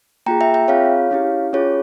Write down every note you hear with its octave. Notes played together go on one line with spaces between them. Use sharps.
A#3 F4 G#4 G5 A#5
E5 G5
E5 G5
C4 F4 G#4 C#5 F5
C#4 E4 G4
C#4 F4 G#4 C#5